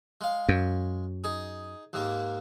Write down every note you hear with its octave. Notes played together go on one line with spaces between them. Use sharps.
G#3 F5
F#2
D#4 G#4
D#2 G#2 A#3